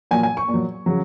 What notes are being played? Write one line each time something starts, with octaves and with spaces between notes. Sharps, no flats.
A#2 F#3 G#5
G#5
C#6
A#2
F#3
C#3 F#3